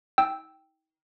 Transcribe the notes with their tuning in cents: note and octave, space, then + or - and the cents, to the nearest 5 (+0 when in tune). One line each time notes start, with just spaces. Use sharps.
D#4 +45 G5 +0 E6 -5